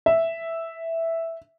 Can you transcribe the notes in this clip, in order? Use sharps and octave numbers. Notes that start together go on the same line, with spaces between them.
E5